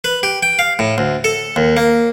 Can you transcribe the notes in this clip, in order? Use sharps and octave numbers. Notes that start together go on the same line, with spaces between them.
B4
G4
G5
F5
A2
D2
A4
D#2
A#3